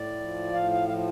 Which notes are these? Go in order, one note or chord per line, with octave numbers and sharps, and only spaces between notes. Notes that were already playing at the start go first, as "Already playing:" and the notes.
Already playing: A2 D5
F3
A2 F5
F5
F3 F5